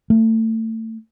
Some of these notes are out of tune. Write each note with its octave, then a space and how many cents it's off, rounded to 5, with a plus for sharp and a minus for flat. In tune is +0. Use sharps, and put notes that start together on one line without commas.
A3 +30